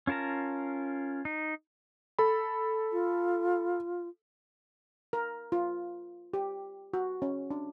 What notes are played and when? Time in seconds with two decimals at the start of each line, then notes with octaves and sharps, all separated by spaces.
0.07 C#4 F4 A#4 A5 A#5
1.25 D#4
2.19 A4 B5
2.92 F4
5.13 A#4
5.52 F4
6.34 G4
6.93 F#4
7.22 C#4
7.51 D4